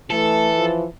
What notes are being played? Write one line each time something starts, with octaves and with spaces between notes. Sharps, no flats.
E3 A3 A4
F3